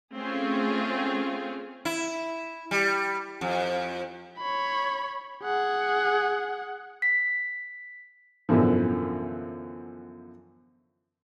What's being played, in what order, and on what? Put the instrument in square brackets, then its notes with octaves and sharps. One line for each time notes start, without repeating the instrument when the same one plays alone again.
[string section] A3 C4 C#4 F4 G#4
[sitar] E4
G3
F2
[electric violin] C#5 B5
G#4 F#5
[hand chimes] B6
[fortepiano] F#2 B2 D3 E3 F3